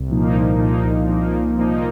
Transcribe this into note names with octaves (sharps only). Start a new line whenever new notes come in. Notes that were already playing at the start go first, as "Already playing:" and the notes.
Already playing: C2
A#2 F3 A#3 D#4
C2
A#2 F3 A#3 D#4
C2
A#2 F3 A#3 D#4
C2
A#2 F3 A#3 D#4